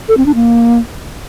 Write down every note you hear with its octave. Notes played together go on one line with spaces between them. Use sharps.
A4
C4
D4
A#3